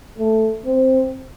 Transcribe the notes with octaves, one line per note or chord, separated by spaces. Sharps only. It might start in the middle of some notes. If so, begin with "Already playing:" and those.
A3
C4